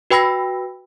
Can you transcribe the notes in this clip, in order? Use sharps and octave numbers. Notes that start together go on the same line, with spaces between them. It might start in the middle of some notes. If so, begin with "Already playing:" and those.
F#4 B4 G5 B5 E6 A#6